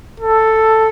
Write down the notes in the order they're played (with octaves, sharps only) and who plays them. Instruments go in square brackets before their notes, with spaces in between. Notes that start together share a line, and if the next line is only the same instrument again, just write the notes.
[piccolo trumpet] A4